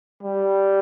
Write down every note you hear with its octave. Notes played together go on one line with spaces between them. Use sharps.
G3